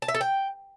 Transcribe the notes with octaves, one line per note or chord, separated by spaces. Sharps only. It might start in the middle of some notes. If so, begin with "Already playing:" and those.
A5
E5
A4
G5